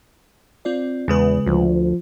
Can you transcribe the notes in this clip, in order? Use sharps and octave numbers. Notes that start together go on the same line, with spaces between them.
C4 F4 D5
E2 C#3 G#3 B4
D2 F3